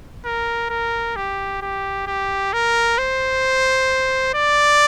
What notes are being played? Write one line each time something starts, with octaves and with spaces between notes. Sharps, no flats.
A#4
A#4
G4
G4
G4
A#4
C5
D5